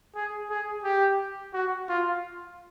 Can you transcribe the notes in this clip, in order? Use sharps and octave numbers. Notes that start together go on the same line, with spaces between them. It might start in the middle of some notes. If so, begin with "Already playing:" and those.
G#4
G#4
G4
F#4
F4